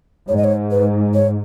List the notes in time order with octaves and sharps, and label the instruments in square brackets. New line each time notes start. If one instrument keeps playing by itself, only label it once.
[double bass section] G#2 [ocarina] C#5
[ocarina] D#5
C#5
B4
C#5